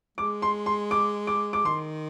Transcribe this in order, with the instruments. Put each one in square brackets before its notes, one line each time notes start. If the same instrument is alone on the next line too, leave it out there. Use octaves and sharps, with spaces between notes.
[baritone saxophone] G#3 [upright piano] D6
[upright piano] C6
C6
D6
D6
D6
[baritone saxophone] D#3 [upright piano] C6